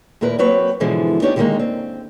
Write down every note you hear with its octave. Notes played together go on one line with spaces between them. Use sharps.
D#2 A#2 E4 A#4 B4
F#3 A#3 C4 B4 C#5
G#2 B2 D3 E3 F3 G#3
B3 D4 D#4 G4 C#5
D3 D#3 G3 G#3 A#3 D#4
C4